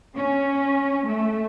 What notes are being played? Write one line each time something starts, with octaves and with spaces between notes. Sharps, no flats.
C#4
A3